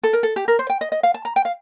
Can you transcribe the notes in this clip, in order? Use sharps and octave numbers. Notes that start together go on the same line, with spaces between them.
A4
A#4
A4
G4
A#4
C5
G5
D#5
D#5
F5
A5
A#5
G5
F5